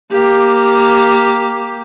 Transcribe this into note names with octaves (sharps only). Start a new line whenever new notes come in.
A#3 G4